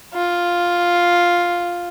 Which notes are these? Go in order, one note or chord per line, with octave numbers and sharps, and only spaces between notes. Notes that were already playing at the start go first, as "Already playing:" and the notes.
F4